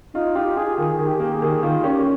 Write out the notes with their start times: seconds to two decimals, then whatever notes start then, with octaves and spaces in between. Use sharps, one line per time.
0.14 D#4 F4
0.35 F4 G4
0.56 F4 G#4
0.77 D#3 G#4
0.99 D#3
1.07 G4
1.20 A#3
1.34 G#4
1.42 D#3
1.63 D#3 F4
1.83 C#4 G4